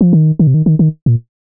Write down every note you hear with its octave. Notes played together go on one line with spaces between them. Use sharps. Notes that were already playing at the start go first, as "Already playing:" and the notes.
F3
D#3
D#3
C3
D#3
D#3
D#3
A#2